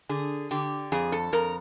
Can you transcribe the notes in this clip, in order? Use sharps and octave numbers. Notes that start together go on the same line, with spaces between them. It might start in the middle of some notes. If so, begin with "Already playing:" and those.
D3 G#4
D3 G4
F2 G#4
A4
F2 A#4